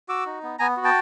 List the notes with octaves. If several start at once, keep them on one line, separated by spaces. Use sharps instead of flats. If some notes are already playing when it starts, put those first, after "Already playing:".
F#4 D6 E6
D#4
B3
B3 G#5 A#5
F#4
G5 A5